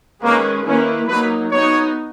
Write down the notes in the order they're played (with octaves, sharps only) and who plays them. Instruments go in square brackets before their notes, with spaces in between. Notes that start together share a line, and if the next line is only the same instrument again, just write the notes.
[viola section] D#3 G#3 C#4 G#4 B4 [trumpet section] A#3
[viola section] D#3 A#3 E4 B4 [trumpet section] C#4
[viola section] F#3 A#3 D#4 [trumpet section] B4
[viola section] B3 D#4 F#4 [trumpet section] C#5